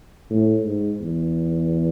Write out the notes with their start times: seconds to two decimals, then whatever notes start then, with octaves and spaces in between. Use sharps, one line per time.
0.30 A2
0.65 G#2
1.01 E2